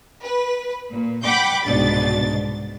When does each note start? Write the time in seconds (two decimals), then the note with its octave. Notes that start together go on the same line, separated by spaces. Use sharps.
0.24 B4
0.92 A#2
1.23 F#5 G5 B5 D6 G6
1.64 C2 G#2 B2 D4 A6